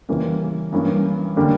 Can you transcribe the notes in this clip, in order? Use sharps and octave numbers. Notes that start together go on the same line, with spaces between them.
C#3 E3 G3 A#3 C#4
G2 E3 A#3 C#4
D3 G3 A#3 C#4